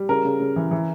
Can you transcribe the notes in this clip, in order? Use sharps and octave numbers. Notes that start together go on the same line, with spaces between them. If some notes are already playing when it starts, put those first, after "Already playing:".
Already playing: G3
C#3 A#4
C#3
C#3
E3
E3